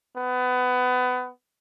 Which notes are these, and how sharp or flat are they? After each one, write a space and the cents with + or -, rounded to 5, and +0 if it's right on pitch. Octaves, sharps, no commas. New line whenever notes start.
B3 +25